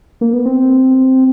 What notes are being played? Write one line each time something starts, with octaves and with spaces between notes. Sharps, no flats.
A#3
B3
C4